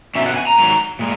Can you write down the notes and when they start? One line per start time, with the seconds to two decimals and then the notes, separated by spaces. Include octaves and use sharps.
0.15 B2 F#3 C#4 E5
0.26 F#5
0.36 G#5
0.47 A#5
0.58 G#2 D#3 F#3
0.99 A#2 G#3